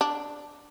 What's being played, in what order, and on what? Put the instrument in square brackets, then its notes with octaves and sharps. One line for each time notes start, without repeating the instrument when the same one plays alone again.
[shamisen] D4